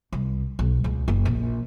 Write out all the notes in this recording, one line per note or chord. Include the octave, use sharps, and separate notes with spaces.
C2
B1
C#2
F#1
A#1